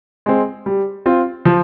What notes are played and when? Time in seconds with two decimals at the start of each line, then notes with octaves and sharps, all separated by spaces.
0.26 G#3 C4
0.66 G3
1.06 C4 F4
1.45 F3